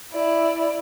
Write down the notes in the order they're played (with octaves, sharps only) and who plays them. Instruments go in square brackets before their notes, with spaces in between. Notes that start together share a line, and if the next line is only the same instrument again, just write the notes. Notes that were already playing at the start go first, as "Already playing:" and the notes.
[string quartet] E4 D5